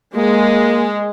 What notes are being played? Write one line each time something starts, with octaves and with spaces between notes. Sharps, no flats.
G#3 A#3